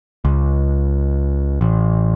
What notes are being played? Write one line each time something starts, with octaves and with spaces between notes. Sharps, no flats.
C#2
A1